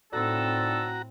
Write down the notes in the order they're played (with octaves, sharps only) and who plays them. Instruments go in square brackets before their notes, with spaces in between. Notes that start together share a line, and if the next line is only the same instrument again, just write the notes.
[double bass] A2 C4 [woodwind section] D3 D#4 A4 [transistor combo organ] F#4 A#5